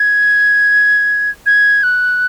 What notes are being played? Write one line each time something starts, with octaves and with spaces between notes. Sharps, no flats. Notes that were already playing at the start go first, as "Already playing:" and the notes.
Already playing: G#6
G#6
F#6